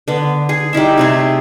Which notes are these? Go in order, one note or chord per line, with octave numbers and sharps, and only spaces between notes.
D3 B3
G#4
G3 D#4 E4 E5
C3 A3 G#4